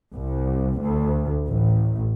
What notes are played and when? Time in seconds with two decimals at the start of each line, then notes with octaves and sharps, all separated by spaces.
0.13 C2
0.80 D2
1.47 A1